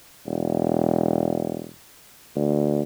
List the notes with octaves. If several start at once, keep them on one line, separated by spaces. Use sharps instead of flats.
E1
D2